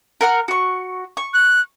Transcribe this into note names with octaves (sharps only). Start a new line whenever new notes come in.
A#4 F#5 F6
F#4 C#6
C#6
F#6